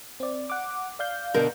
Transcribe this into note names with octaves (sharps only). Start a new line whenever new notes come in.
C4 D5
F#5 D6
D5 F5 G6
B2 D3 A#4